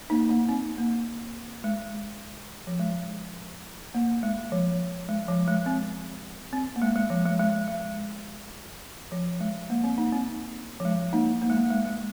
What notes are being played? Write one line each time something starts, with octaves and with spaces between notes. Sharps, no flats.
A#3 D#4
A#3 D#4
C4
A#3
G#3
F3
G#3
A#3
G#3
F3
G#3
F3
G#3
C4
C4
A#3
G#3
G#3
F3
G#3
G#3
G#3
F3
G#3
A#3
C4
A#3 D#4
C4
F3
G#3
A#3 D#4
A#3
G#3
A#3
G#3
G#3